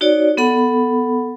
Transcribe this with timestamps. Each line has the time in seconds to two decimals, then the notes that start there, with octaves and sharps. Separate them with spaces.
0.01 D#4 F#4 C#5 D5
0.37 B3 A4 F#5 B5